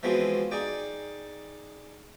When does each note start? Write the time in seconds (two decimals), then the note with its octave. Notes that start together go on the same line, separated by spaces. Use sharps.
0.03 E3 F3 G#3 B3 C4 F#4
0.51 D#4 G#4 D5 G5